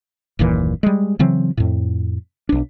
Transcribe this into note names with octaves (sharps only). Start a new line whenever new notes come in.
F#1 D#2 A#2 E3
G3 G#3
C#3 E3 F#3 C4
F2 A2
B1 D4